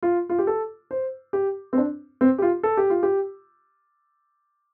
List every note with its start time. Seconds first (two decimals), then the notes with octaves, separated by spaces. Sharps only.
0.03 F4
0.29 F4
0.39 G4
0.47 A4
0.91 C5
1.33 G4
1.73 C4
1.78 D4
2.21 C4
2.38 G4
2.42 F4
2.63 A4
2.77 G4
2.90 F4
3.03 G4